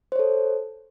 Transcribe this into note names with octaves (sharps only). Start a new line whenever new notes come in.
A4 C5 C#5